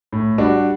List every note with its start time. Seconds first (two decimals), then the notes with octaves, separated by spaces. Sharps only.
0.13 A2
0.38 G3 D4 F#4